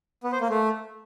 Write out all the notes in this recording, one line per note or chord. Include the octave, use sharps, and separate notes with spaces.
B3
C5
A#3
A3